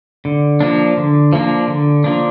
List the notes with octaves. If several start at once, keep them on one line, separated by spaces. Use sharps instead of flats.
D3
F3 A#3 D4
D3
F3 A#3 D4
D3
F3 A#3 D4